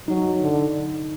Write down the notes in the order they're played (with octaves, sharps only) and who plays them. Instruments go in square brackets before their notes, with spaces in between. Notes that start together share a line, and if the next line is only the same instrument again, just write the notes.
[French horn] F#3 [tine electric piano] D#4
[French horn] D3